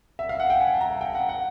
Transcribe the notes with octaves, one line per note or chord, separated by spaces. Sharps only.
E5
F5
F#5
G5
G#5
A5
A#5
G5
F#5
F#5